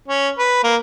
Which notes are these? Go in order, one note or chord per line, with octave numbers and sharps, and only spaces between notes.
C#4
B4
A#3